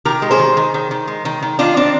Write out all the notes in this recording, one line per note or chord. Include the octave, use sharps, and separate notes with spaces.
D#3 G4 A#4
G#3
G#4 C5
D#3
D#3
D#3
D#3
G#3
D#3
D#3
D#3 D4 F4
C4 D4